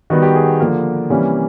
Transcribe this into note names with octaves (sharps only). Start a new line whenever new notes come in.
D#3 G3 B3 F#4
G4
G#4
D3 F3 A#3
C3 E3 G3 A#3 C#4